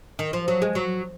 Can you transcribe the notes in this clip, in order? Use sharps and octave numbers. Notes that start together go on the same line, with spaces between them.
D#3
F3
F#3
G#3
F#3